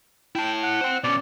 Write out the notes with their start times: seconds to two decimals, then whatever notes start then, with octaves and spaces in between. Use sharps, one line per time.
0.35 E4 G5 A5
0.63 F#5
0.81 C5 G5
1.04 B2 C#4 D5